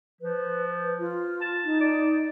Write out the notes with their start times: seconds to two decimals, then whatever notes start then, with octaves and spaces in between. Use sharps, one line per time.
0.21 F3 B4
0.99 F4
1.41 A5
1.64 D#4
1.81 D5